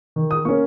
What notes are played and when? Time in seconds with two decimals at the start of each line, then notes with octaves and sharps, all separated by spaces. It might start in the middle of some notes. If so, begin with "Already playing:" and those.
0.16 D#3
0.31 D#6
0.45 A#3 C#4 C#6